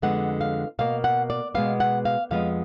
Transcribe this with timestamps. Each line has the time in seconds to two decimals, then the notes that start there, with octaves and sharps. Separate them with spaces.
0.02 F2 D3 G#3 B3 F#5
0.41 F5
0.79 B2 A#3 F5
1.04 F#5
1.30 D5
1.55 B2 G#3 B3 F5
1.80 F#5
2.05 F5
2.31 F2 F3 G#3 B3 F5